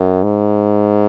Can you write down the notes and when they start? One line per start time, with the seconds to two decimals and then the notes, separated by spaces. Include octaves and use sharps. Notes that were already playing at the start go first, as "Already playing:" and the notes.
Already playing: F#2
0.23 G#2